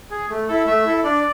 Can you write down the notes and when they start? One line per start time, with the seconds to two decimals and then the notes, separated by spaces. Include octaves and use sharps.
0.11 G#4
0.30 A3
0.48 E4 A4
0.66 A3 E5
0.86 E4 A4
1.04 D4 D5